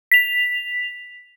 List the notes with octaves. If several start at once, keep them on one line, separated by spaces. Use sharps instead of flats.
B6 F7